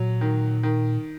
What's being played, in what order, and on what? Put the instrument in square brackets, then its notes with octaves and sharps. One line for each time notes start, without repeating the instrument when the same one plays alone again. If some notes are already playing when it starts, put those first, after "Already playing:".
Already playing: [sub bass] A#2 [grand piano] F#3
[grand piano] D#3
D#3